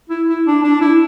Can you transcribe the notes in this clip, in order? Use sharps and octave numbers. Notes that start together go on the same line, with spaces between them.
E4
E4
D4
D4
E4